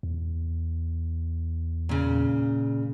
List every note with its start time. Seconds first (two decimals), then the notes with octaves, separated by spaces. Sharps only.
0.03 E2
1.89 A#2 C#3